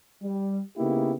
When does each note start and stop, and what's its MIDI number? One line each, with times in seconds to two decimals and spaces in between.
0.23 0.61 55
0.77 1.15 49
0.77 1.15 58
0.77 1.15 59
0.77 1.15 63
0.77 1.15 64
0.77 1.15 67